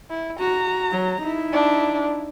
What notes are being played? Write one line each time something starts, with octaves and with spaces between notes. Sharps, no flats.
E4
F#4 A#5
F#3
D#4 E4
D4